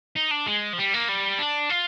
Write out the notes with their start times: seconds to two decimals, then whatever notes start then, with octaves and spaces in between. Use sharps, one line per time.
0.16 D#4
0.31 D4
0.47 G#3
0.73 F3
0.78 G3
0.94 A#3
1.09 G3
1.39 D4
1.70 F4